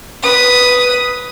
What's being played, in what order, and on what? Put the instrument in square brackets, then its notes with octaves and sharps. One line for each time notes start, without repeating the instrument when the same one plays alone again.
[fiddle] B4 D#6